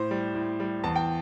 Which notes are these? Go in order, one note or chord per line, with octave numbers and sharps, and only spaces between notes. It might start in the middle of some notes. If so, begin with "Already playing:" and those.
Already playing: A2 C5
G3
A2
G3
E2 A5
G5